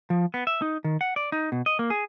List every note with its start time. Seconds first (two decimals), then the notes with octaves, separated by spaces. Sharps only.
0.10 F3
0.34 B3
0.47 E5
0.62 D#4
0.84 D#3
1.01 F#5
1.16 D5
1.32 D#4
1.52 B2
1.66 D#5
1.79 A#3
1.90 G#4